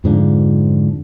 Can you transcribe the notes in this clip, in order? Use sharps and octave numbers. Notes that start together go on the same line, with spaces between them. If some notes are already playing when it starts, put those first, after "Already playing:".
F2 G#2 D3 F3